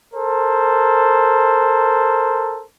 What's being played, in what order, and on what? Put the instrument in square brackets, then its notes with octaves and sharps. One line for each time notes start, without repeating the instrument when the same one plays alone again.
[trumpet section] A4 A#4 C5